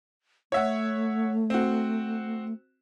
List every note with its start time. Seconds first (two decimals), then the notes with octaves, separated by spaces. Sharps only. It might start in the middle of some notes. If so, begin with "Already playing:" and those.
0.52 A3 C#5 E5 F#5
1.50 C4 F#4